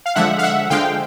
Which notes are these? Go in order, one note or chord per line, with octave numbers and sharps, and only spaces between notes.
F5
D3 F3 G#3 E5 F#5
F5
E5 F#5
D3 F3 G#3 F5 G5